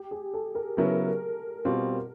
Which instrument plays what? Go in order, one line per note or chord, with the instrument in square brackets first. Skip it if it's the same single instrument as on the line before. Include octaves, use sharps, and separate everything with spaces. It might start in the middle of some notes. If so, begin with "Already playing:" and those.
Already playing: [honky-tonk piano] G4
G#4
A4
A#4
[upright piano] C#3 F#3 B3 E4 [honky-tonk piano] A#4
[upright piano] B2 G3 C4 F4